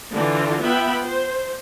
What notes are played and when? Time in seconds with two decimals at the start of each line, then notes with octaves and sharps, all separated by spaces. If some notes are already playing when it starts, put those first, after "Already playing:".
0.14 D3 E3 F4
0.64 B3 F4 E5 G5 B5
1.04 C5